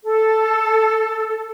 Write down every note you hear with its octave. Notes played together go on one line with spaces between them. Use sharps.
A4